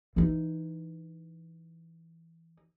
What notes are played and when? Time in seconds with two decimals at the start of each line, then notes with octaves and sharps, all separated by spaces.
0.16 E3 D#4